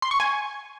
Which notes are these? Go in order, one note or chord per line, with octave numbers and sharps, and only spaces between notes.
C6
C#6
G#5